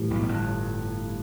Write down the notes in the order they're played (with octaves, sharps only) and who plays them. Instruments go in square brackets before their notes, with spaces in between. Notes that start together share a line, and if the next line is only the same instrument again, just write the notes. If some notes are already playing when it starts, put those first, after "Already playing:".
Already playing: [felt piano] A2 E3 G3
[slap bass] B1 B2
F#2
G1 G2